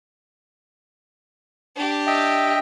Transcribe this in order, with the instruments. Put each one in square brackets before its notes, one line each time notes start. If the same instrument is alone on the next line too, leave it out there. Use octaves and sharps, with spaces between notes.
[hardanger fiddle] D4 G4
[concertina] D#5 E5 G5